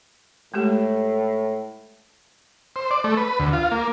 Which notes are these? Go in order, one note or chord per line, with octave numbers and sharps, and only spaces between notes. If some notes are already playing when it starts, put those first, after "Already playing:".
A2 G#3 A3 G4
C5
D5
A3
B4
D2
F4
A#3